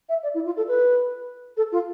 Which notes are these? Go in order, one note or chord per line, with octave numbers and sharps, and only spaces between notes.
E5
D5
E4
F4
A4
B4
A4
F4